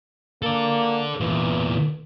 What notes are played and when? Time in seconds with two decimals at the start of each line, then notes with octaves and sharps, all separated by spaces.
0.42 A#3 A4 D5
1.20 E2 A#2 E3